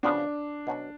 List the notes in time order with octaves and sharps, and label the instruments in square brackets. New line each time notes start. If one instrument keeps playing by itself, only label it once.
[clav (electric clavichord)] C#3 F3 B3 F#4 [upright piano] D4
[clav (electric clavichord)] B2 F#3 C#4 F#4